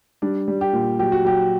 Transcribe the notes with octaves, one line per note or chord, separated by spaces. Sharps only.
G3 D4
G3
G4
A#2
F#3 G4
F#4
F#3 G4